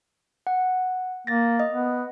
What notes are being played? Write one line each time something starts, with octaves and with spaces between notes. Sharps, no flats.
F#5
A#3 A6 A#6
D#5
B3